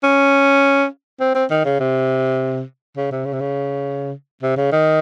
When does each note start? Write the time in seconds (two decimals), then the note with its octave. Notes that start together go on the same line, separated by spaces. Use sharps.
0.03 C#4
1.20 C4
1.35 C4
1.51 D#3
1.65 C#3
1.80 C3
2.97 C#3
3.12 C3
3.25 C#3
3.33 C3
3.41 C#3
4.43 C3
4.57 C#3
4.72 D#3